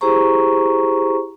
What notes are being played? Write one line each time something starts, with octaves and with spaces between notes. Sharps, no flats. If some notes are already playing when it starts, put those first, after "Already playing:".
E4 G4 G#4 C5 A#5 C#6